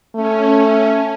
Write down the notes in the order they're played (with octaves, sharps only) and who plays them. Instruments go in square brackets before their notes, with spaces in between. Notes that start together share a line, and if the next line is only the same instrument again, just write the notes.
[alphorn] A3 [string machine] C#4